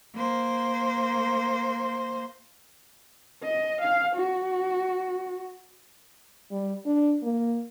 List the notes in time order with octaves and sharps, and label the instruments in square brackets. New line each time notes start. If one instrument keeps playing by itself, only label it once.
[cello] A#3 C5
[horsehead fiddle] D#5
F5
F#4
[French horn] G3
D4
A#3